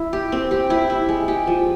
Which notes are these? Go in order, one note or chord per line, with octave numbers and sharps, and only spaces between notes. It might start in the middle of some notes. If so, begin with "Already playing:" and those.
Already playing: E4
G4
C4
G4
E4
E4
G#3
G4
F3